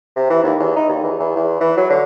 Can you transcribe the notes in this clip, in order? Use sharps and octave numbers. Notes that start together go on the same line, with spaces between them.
C3
E3
D#2
E2
D#4
D#2
E2
E2
E2
E3
F#3
D3